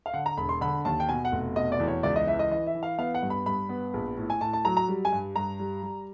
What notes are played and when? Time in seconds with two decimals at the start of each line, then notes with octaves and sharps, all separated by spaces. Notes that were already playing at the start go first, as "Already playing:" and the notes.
0.06 F5
0.14 D3 F#5
0.26 A#5
0.37 E1 B5
0.49 C6
0.61 D3 B5
0.85 D#2 A5
1.00 G5
1.09 B2 G#5
1.25 F#5
1.32 F1
1.56 B2 D#5
1.72 D5
1.80 E2
1.88 C#5
2.03 C#2 D5
2.16 D#5
2.27 E3 E5
2.39 D#5
2.51 E3 D#5
2.67 E5
2.75 E3
2.83 F5
2.98 B3 F5
3.15 F#5
3.22 G2
3.30 B5
3.46 G2 B5
3.69 B3
3.94 A#1
4.17 A2
4.30 G#5
4.41 A2 A5
4.53 A5
4.65 F#3 A#5
4.77 A#5
4.88 G3
5.05 G#5
5.12 G2
5.36 G2 A#5
5.60 G3
5.83 G3